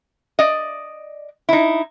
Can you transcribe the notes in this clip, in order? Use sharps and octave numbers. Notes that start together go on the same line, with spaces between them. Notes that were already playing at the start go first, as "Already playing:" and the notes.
D5 D#5
D#4 E4